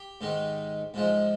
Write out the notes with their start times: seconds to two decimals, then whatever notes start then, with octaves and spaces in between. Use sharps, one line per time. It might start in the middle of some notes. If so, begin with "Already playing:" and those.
Already playing: G4
0.21 G#2 D#3 G#3
0.94 G#2 F3 G#3